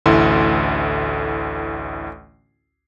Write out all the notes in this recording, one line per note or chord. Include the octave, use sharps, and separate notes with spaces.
A1 D2 E4 A4 C6